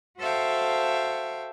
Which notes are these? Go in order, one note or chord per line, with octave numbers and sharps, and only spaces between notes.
F#4 A4 C5 E5 F5 G5